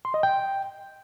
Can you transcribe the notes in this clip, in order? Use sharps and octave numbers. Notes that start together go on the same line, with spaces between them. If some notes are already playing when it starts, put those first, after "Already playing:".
C6
D#5
G5